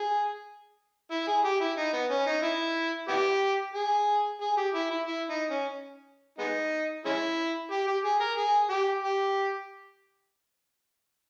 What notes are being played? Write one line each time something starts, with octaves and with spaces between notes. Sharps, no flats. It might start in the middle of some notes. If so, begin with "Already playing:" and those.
Already playing: G#4
E4
G#4
G4
E4
D#4
B3
C#4
D#4
E4
B3 E4 G4
G#4
G#4
G4
E4
E4
E4
D#4
C#4
G#3 B3 D#4
G#3 C#4 E4
G4
G4
G#4
A#4
G#4
G4
G4